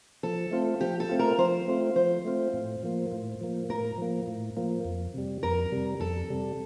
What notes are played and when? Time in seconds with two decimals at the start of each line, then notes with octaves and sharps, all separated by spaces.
0.23 F3 A4
0.51 A3 C4 F4
0.81 F3 G4
1.00 A4
1.09 A3 C4 F4
1.19 A#4
1.38 F3 C5
1.68 A3 C4 F4
1.96 F3 C5
2.25 A3 C4 F4
2.54 A2
2.83 F3 A#3
3.12 A2
3.41 F3 A#3
3.69 A2 A#4
3.98 F3 A#3
4.27 A2
4.57 F3 A#3
4.85 F2
5.14 C3 G3
5.43 F2 A#4
5.72 C3 G3
6.00 F2 A4
6.30 C3 G3